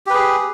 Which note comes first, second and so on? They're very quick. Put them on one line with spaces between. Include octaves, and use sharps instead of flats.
G4 B4 G#4